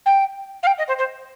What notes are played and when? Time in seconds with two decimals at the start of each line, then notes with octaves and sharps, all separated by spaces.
0.06 G5
0.63 F5
0.67 G5
0.78 D#5
0.88 C5
0.98 C5